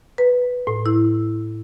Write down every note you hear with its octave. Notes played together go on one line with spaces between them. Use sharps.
B4
A2
E4